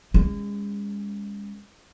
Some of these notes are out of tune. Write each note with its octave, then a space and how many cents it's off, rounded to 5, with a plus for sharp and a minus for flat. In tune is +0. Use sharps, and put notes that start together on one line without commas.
G#3 -35 C#4 +0